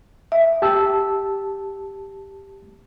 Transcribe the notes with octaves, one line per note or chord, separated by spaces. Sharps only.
E5
G4 A5 E6